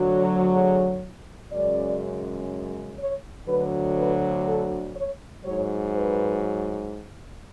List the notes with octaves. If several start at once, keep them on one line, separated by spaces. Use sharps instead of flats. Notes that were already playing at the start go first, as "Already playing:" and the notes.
Already playing: D2 D3 F#3
G#4
F#2 C#3 G#3 D5
C#5
D2 D3 F#3 B4
B4
A4
C#5
G#2 F#3 C#5
B4